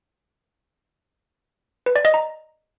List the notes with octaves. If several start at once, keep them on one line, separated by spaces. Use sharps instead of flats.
B4
D5
D#5
A#5